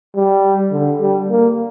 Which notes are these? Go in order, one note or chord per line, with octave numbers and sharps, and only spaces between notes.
G3
D3
G3
A#3